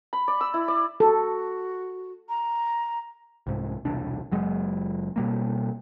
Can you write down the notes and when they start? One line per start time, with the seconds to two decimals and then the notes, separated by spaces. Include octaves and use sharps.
0.13 B5
0.28 D5
0.41 E6
0.54 E4
0.68 D5
1.00 F#4 A4
2.29 A#5
3.47 C2 G#2
3.85 E1 C2 D4
4.32 F#1 F#3 G#3
5.16 B2 G3 A#3